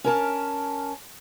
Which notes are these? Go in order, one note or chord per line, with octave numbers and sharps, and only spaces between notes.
C#4 A#4 A5